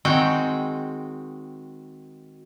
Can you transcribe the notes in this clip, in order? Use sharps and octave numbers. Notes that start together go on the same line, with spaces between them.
D#3 G#3 C4 F#4 G5